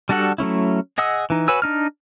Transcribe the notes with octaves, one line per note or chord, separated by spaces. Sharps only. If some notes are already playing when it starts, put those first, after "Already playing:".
G3 D4 F#4 A4 F#5
F#3 A3 C#4 E4
G#4 D#5 F#5 D#6 E6
E3 D#4
F#4 B4 C#5 G#5 E6
D4 D#4 F6